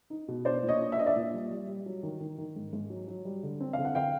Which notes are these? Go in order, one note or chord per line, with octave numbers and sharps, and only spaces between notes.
D#4
B2
D4 C5 D5
A#2
C#5 D#5
D4
E5
D4 D#5
D5 E5
A#2
G3
G3
G3
F#3
D#3
D#3
D#3
G#2
G#2
F#3
F#3
G3
D3
C4
F5
D3
F#5
D3 F5 G5